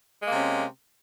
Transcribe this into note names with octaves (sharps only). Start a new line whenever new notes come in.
C3 G#3 A#3 C#4